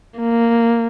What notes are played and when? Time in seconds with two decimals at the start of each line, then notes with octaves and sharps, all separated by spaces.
0.19 A#3